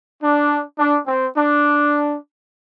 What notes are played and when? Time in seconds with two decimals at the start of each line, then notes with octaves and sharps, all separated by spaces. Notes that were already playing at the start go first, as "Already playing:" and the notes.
0.21 D4
0.77 D4
1.06 C4
1.35 D4